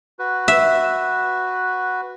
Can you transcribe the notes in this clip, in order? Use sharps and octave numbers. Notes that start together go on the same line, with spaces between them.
F#4 B4
E5